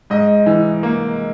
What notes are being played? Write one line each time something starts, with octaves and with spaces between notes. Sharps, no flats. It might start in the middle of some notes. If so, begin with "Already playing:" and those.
G#2 D#5
E3
A#3